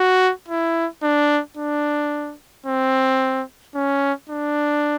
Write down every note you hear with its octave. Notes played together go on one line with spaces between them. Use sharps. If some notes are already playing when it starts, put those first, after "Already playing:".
Already playing: F#4
E4
D4
D4
C4
C#4
D4